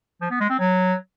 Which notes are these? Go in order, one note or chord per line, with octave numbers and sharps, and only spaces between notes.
F3
B3
G#3
C4
F#3